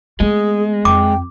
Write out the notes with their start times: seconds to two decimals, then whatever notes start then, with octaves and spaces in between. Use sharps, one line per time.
0.20 G#3 A3 B3 G#4
0.85 F2 G5 D6